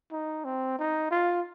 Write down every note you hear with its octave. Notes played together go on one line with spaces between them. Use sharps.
D#4
C4
D#4
F4